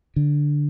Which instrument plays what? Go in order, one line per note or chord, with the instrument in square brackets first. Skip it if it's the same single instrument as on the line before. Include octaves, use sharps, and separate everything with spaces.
[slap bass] D3